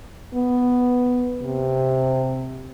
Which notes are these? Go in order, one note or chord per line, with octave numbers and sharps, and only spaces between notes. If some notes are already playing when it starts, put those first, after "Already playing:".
B3
C3